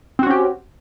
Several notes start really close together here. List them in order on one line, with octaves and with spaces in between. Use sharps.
C4 F#4 C#4 G4